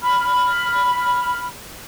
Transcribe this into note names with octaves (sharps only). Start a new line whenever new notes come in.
B5 F6